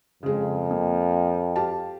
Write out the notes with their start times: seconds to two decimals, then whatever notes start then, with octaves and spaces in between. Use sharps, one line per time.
0.23 F2 C#3 G#3
0.71 A#3
1.56 G4 F5 A5